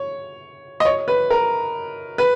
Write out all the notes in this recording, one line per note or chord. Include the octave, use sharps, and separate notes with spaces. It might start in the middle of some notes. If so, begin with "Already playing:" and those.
Already playing: C#5
D#5
C#5
B4
A#4
B4